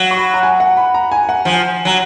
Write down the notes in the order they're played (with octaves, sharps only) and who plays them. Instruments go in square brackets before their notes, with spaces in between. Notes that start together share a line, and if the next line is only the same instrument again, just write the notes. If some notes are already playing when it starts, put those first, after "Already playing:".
Already playing: [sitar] F#3 [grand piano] F5 F#5
[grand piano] C#6
B5
A#5
G#5
F#5
B5
A#5
G#5
F#5
[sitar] F3 [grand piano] G#5
[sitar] F#3 [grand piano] A#5